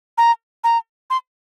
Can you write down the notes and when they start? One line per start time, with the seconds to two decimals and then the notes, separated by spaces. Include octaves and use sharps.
0.18 A#5
0.64 A#5
1.10 C6